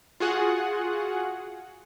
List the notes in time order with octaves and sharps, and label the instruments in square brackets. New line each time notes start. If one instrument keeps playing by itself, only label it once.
[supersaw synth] F4 F#4 G#4 F#5